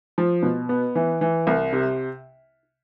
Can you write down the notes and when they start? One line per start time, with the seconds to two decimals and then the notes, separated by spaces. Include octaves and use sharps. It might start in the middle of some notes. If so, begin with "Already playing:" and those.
0.18 F3
0.43 B2
0.69 B3
0.95 E3
1.21 E3
1.47 C2
1.73 C3